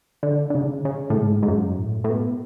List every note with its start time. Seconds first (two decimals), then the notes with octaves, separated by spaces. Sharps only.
0.23 D3
0.50 D3
0.55 C#3
0.85 C#3
1.10 A2
1.17 G#2
1.43 G#2
1.48 F#2
1.78 A2
2.04 A2
2.10 B2